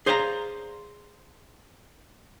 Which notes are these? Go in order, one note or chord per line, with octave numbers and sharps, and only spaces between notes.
G#4 C5 D5 F5 G5 A#5